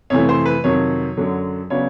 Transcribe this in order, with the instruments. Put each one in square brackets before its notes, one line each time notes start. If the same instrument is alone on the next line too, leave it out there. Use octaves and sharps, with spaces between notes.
[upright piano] F2 C3 E3 A3 C#5
C5
B4
F2 C3 D#3 F#3 C#5
F#2 D3 F#3
C#3 F#3 B3 D4 C#5